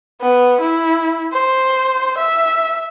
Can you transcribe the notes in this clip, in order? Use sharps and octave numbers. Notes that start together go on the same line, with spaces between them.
B3
E4
C5
E5